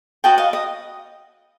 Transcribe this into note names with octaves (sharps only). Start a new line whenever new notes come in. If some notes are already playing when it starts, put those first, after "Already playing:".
F#4 B4 D#5 G5 A5
D#5 F5
D#5